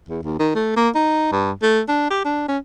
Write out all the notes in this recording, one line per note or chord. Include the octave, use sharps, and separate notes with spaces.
E2
D#2
D#3
A3
A#3
D#4
G2
A3
D4
G4
D4
C#4